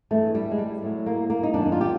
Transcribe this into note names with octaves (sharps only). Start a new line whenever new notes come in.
G2 E3 A3
G3
G#3
G3
A2 F#3
A#3
A#3
D#4
F#2 D#3 F#3 D4
F4
G4